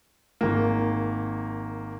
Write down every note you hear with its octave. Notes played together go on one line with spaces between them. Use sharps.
G#1 A#3